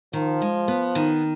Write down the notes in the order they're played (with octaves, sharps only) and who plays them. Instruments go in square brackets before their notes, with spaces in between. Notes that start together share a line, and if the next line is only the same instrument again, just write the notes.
[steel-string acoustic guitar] D#3 [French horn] F3
[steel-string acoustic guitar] G#3
B3
D#3